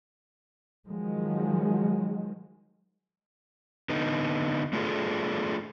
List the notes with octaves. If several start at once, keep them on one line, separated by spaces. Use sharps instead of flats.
D#3 F3 F#3 G#3
D3 B3 D#4
A3 D4 F4 F#4 G#4 A4